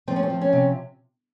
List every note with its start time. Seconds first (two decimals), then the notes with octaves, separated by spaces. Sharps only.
0.08 F3 C4
0.16 C#4
0.23 C4
0.30 F3
0.41 C#4
0.53 C3